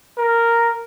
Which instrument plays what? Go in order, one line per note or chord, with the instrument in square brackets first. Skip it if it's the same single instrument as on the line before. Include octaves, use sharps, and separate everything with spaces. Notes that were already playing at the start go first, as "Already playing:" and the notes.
[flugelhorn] A#4